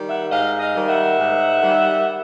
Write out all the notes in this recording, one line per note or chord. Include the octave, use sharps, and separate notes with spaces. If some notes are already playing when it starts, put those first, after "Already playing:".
Already playing: D#3 G3
E5 F#5
G#2 D#5 F5
D#5 F5
D#3 G3
E5 F#5
G#2
D#3 G3